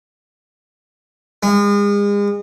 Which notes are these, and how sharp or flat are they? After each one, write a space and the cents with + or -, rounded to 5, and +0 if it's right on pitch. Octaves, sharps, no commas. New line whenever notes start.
G#3 -35